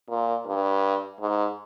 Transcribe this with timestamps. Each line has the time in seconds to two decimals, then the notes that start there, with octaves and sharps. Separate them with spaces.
0.09 A#2
0.46 G2
1.20 G#2